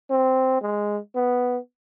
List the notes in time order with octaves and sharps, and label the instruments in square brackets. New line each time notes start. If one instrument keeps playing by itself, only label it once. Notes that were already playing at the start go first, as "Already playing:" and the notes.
[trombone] C4
G#3
B3